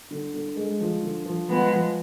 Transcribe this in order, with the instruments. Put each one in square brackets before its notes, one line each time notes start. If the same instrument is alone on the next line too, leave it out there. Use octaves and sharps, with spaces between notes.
[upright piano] D3
D3
G#3
F3
D3
F3
[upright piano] F3 [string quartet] G#3 B3
[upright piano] F3